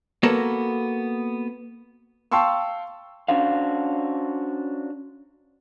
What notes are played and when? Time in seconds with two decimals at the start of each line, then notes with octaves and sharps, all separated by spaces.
0.23 A#3 B3 F#4 A4 A#4
2.32 F5 G5 A5 C6 C#6 E6
3.28 C#4 D4 F#4 C5 F5